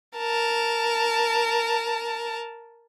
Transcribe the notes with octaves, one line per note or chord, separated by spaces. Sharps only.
A#4 A5